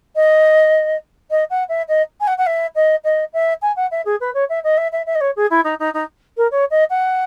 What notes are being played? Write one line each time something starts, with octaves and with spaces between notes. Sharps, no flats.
D#5
D#5
F#5
E5
D#5
G#5
F#5
F#5
E5
D#5
D#5
E5
G#5
F#5
E5
G#4
B4
C#5
E5
D#5
E5
E5
E5
D#5
C#5
G#4
E4
D#4
D#4
D#4
A#4
C#5
D#5
F#5